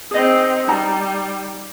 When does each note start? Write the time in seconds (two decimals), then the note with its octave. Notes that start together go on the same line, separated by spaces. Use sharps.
0.11 C4 D#4 G#4 D#5
0.68 G3 D#4 A#5